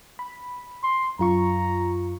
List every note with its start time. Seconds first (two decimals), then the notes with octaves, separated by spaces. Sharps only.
0.19 B5
0.83 C6
1.19 F#2 F4 A#5 C#6